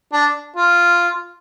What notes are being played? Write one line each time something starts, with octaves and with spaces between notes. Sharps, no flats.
D4
F4